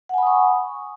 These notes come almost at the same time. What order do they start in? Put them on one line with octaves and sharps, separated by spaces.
F#5 G#5 B5 D#6 C#6